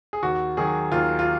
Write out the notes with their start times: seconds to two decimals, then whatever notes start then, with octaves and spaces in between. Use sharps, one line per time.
0.13 G#4
0.23 D#2 F#4
0.57 D#3 F#3 G#4
0.92 D#2 F4
1.19 F4